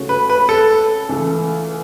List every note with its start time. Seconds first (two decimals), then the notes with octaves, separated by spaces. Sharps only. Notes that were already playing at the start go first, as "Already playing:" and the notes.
Already playing: C#2 C#3 A3 F#4 C#5
0.09 B4
0.30 B4
0.49 A4
1.09 C#2 C#3 E3 A3